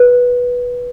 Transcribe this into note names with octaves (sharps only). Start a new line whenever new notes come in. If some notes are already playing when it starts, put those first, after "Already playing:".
Already playing: B4